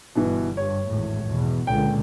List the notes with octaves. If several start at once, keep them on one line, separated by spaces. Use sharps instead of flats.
G1 G2 B2 E3
G2 C#5
G#1 E2 A2
E2 B2
C#2 A#2 D3 G5